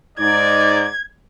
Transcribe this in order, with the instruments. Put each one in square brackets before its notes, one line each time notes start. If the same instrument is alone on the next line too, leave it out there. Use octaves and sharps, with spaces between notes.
[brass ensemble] G#2 D#4 D5 [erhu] G#6